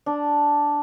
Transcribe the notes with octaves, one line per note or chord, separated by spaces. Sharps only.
D4